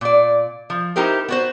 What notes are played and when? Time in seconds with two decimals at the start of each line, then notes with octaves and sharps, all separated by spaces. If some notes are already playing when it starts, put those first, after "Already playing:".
0.01 A#2 D5
0.70 F3
0.96 D#4 E4 G4 A#4 C5
1.28 B3 F#4 C5